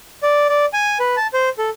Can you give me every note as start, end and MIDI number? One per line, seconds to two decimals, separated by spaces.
0.23 0.48 74
0.49 0.66 74
0.73 0.98 80
1.00 1.16 71
1.17 1.27 81
1.34 1.49 72
1.58 1.70 69